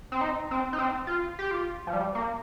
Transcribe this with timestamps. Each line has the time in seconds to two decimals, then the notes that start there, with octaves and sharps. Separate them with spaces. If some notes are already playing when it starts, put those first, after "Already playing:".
0.12 C4
0.21 D#4
0.51 C4
0.73 D#4
0.79 C4
1.07 F4
1.39 G4
1.51 F4
1.87 F3
1.93 G3
2.15 A#3